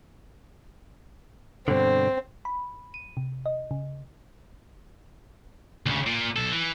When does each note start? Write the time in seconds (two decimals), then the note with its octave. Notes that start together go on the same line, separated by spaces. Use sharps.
1.68 G2 B2 D3 C4
2.45 B5
2.94 D#7
3.17 C3
3.46 D#5
3.71 C#3
5.86 D2 C#3
6.06 A#2
6.36 B1 A4
6.52 E3